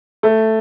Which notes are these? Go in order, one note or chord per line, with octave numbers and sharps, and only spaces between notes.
A3